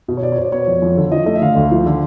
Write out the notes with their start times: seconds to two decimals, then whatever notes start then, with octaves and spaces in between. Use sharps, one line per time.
0.08 B2
0.17 C#5
0.22 B2 D5
0.32 C#5
0.38 B2 C5
0.45 D5
0.52 B3 C#5
0.67 F2
0.82 F2
0.97 D3
1.12 F3 D#5
1.26 A3 D#5
1.36 E5
1.42 D3 F5
1.56 D2
1.71 F3
1.86 D3